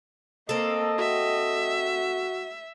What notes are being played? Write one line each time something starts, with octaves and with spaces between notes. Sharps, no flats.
A#3 C4 A4 D#5
F#4 E5